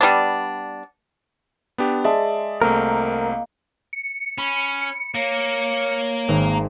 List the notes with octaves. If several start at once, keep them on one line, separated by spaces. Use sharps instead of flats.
G3 B3 D4
B3 D4 G4
G#3 D5 E5 A5
C2 A3 A#3 C4 A#4
C#7
C#4 B5
A#3 C#5 A#6
G#1 A#5